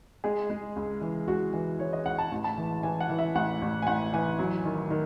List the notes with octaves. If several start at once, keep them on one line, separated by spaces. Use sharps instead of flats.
G#3 G#4
G#3
C#2
E3
C#2 F#4
E3 G#4
E3 C#5
D#5
C#2 F#5
A5
A1
A5
E3
E3 G#5
F#5
E3
E5
A1 F#5
A1
G#5
A1 F#5
E3 G#5
F#3
D#3
D#3